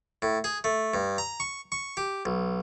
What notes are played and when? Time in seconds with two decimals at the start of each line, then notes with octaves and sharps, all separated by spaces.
0.22 A2
0.44 G#4
0.64 A3
0.94 G2
1.18 A#5
1.40 C#6
1.72 C#6
1.97 G4
2.26 B1